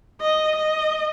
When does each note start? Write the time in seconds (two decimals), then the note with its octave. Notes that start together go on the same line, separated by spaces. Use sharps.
0.21 D#5
0.56 D#5